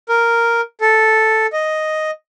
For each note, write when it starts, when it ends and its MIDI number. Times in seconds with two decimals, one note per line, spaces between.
0.09 0.61 70
0.81 1.47 69
1.53 2.11 75